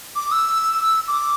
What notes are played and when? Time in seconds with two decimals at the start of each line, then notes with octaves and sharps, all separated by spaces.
0.16 D6
0.31 E6
1.08 D6